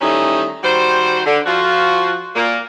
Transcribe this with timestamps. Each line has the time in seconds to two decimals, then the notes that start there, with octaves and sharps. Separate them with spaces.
0.01 D#3 E3 G3 A3 C#4 D#4
0.64 D#3 G3 F#4 C5
1.26 D3
1.47 F3 F4 F#4
2.35 A#2 A#3